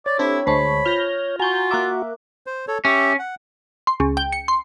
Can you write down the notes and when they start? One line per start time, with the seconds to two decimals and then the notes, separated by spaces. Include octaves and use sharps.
0.06 C#5 D5
0.19 C4 D4 E4 G4 A4
0.47 D2 G#3 C5 A5 B5 C#6
0.85 F4 F6 G6 A#6 F7 G7
1.39 F4 F#4 G#5 A#5 C#6 G6
1.71 A#3 A#4 E5 D6 F#6
2.47 C5
2.68 A4 C#5
2.85 C#4 G4 E5
3.19 F#5
3.87 C6
4.00 C#2
4.17 G5
4.32 C#7
4.48 C6